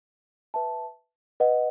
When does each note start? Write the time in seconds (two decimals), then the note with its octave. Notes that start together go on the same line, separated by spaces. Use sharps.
0.54 B4 E5 A5
1.40 B4 D#5 F#5